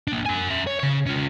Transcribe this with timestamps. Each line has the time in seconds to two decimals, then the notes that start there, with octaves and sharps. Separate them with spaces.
0.08 A#3 D4
0.26 F#4 G#5
0.49 A#4 E5
0.67 C#5
0.80 C#3 C#5
1.07 C#4 F4